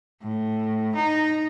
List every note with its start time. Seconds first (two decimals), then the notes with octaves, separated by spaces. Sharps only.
0.23 A2
0.95 D#4